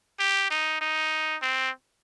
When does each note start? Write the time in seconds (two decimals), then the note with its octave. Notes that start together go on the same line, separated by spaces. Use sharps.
0.19 G4
0.51 D#4
0.81 D#4
1.42 C4